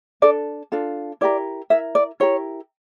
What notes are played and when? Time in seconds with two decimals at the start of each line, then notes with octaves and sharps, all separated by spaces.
0.22 D4 A4 D5
0.72 D4 F4 A4
1.21 E4 G4 A#4 D5
1.70 E4 A#4 E5
1.95 D5
2.20 E4 G4 A#4 C#5